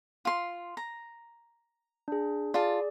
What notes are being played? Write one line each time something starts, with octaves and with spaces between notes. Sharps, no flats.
F4 C6
A#5
D4 G#4
F4 G#4 D5 A5